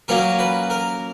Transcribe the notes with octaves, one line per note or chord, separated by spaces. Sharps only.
A#2 F#3 A#3 C#4 A#4
B4
A#4